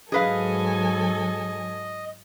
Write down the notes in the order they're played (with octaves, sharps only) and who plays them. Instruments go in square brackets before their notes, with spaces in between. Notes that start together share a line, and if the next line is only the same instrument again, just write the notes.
[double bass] G#2 F#3 [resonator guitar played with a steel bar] G#4 B4 F5 [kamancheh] A4 G#5 [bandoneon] D#5